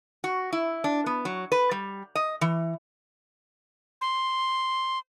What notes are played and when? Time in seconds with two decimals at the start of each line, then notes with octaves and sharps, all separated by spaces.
0.24 F#4
0.53 E4
0.84 D4
1.06 B3
1.25 F#3
1.52 B4
1.71 G3
2.15 D#5
2.41 E3
4.01 C6